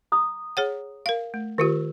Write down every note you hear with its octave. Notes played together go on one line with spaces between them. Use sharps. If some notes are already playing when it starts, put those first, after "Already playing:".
A#5 D#6
G#4 C#5 F#5
A#4 F5
A3
D#3 F4 G4 A#4